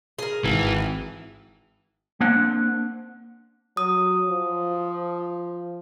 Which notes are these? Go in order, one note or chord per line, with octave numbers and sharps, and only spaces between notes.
G#4 A#4
G#1 E3
A#3 C4 D4 C5 F#5
F#3 D#6
F3